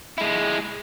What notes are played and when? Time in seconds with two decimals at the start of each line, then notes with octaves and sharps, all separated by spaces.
0.18 G#3 E4